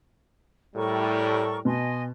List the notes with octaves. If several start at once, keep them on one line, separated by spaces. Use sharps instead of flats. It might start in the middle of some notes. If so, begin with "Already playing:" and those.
A2 G3 A4 A#4 C#6
B2 D#5 G#5 C6